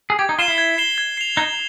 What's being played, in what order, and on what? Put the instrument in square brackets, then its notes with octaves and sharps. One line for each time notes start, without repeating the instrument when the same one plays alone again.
[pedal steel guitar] G#4
[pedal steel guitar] G4 [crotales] G#6
[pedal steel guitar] D#4
[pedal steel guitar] F4 [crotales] C7 E7 G7
[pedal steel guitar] E4
[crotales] G#6
C7 E7 G7
G#6
C7 F7
[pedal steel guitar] D#4 [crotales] G#6